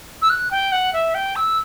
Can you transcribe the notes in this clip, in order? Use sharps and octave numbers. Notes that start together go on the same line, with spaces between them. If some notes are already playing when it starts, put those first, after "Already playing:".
E6
F#6
G5
F#5
E5
G5
E6